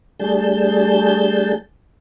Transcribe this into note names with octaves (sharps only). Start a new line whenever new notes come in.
G3 A3 D4 G#4 A5 G6